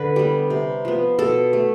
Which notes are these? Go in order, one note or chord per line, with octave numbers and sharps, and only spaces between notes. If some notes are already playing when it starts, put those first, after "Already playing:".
Already playing: D3 B4
G3 B3
C3
F3 B3
B2 A4
A3